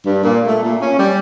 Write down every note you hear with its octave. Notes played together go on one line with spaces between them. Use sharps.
G2
A#2
A3
A#2
C#4
G3